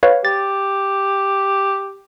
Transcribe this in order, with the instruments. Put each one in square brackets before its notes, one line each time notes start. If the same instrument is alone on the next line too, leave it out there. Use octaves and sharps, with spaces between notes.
[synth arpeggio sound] B4 C#5 F5
[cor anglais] G4 [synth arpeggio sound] A6